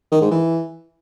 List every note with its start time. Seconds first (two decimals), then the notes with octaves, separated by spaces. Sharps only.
0.12 D#3
0.21 G#2
0.31 E3